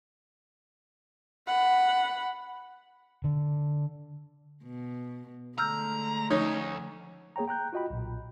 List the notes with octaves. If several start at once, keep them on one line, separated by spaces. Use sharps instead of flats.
F#5 B5
D3
B2
D3 G#3 A3 A#5 E6 F6 G6
D2 F3 C#4 D#4 C#5
A#3 G#4 C#5 G5 A#5
G5 A#5 F#6 G6
F4 F#4 D#5 G5 B5
B1 A#2